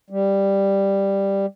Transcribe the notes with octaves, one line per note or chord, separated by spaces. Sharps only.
G3